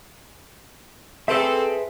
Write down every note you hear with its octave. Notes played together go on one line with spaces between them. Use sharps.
C4 G#4 A4 B4 E5